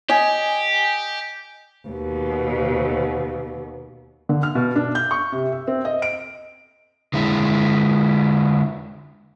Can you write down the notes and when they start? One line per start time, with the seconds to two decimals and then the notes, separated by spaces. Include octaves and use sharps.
0.09 G4 D#5 G#5
1.88 D#2 B2
4.29 D3
4.43 F6
4.55 B2
4.76 D4
4.95 G6
5.11 C#6
5.32 C3
5.52 E5
5.67 C4
5.85 D#5
6.02 D7
7.14 D3 G#3 E4